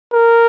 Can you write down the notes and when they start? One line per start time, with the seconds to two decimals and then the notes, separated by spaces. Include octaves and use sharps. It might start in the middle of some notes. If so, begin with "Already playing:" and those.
0.13 A#4